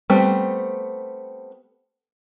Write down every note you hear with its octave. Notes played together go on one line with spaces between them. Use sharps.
G3 A3 B3 C4